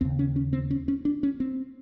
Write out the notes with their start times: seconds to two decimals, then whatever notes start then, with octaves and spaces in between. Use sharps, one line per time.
0.01 D#2 C#3 C4
0.19 C#4
0.36 C#4
0.53 C4
0.71 C#4
0.88 C#4
1.05 D4
1.23 C#4
1.40 C4